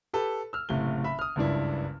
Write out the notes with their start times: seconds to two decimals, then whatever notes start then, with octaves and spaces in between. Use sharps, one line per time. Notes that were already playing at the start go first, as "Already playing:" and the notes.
0.14 G4 A4 B4
0.53 E6 F6
0.69 F#1 A2 C3 G7
1.04 E5 B5
1.19 D#6 F6
1.36 F#1 C#2 G2 D4 E4